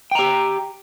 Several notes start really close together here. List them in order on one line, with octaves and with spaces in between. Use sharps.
G5 A#5 G4